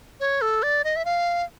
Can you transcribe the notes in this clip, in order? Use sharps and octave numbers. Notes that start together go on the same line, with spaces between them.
C#5
A4
D5
D#5
E5
F5